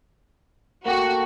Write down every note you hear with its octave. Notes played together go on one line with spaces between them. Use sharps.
A#3 F#4 G4 A4